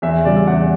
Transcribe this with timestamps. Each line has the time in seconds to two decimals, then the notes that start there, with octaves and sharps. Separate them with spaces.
0.02 E2 E5
0.24 C#3 G3 D5
0.36 E5
0.47 E2 F#5